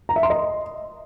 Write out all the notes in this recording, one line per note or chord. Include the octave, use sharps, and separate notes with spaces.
A#5
E5
C6
D#5